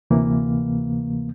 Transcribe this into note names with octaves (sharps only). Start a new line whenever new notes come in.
D2 C3 E3 A#3